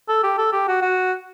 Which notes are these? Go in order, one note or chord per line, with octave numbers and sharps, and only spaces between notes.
A4
G4
A4
G4
F#4
F#4